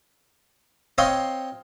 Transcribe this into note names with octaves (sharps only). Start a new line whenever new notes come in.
C4 C#5 D#5 F5 C6